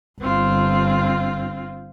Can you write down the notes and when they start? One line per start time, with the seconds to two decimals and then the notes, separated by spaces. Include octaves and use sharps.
0.21 G1 C4 F4